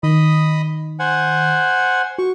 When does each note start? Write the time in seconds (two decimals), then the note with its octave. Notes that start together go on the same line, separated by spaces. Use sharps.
0.03 D#3 D#5 B5 D#6
0.99 C5 F#5 G#5
2.18 F#4 C#6